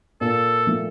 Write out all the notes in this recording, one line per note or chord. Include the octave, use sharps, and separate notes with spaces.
A#2 A4
F3 A3